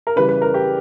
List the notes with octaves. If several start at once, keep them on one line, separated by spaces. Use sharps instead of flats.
A#4
C#3 E3 G3 B4
B4
A#4
G4